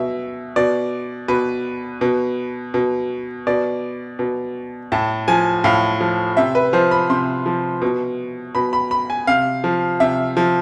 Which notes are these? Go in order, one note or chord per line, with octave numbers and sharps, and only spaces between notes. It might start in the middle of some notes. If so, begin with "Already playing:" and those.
Already playing: B2 E5
B2 D5
B2 B4
B2
B2
B2 D5
B2
A2 A5
F3 G#5
A2 F5
F3
C3 E5
B4
F3 C5
B5
C3 C6
F3
B2
B2 B5
B5
B5
G#5
C3 F5
F3
C3 E5
F3